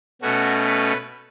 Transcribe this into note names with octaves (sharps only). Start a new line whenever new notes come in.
B2 A3 C#4 F#4
B4